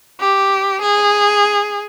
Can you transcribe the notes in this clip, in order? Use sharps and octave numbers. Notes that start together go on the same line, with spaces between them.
G4
G#4